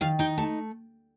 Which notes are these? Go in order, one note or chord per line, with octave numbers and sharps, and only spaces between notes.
D#3 F5
D#4 G5
A3 A5